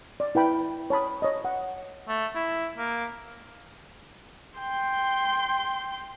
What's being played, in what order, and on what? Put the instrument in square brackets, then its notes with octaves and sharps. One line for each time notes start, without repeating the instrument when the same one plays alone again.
[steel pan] D5
E4 B4 G5 B5
C#5 A5 B5 D#6
C#5 D#5
F#5
[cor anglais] A3
E4
A#3
[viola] G5 C6